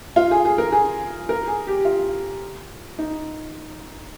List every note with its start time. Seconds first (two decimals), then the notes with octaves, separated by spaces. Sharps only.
0.16 F4
0.31 G#4
0.45 G#4
0.58 A#4
0.72 G#4
1.29 A#4
1.47 G#4
1.67 G4
1.85 F4
2.98 D#4